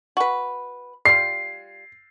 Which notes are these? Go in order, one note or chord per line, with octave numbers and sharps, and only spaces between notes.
F#4 B4
G3 F4 C7